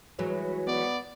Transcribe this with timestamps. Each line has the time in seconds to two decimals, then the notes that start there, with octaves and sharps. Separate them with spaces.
0.19 E3 F#3 G#3 B4 C#5
0.68 B3 D5